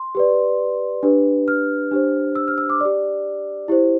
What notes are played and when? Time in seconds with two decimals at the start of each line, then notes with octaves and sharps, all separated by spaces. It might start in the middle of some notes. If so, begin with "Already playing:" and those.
Already playing: C6
0.15 G4 B4 D5
1.03 D4 G4 B4
1.48 F6
1.91 D4 G4 C5
2.35 E6
2.48 F6
2.58 E6
2.70 D6
2.81 G4 D5
3.68 E4 G4 C5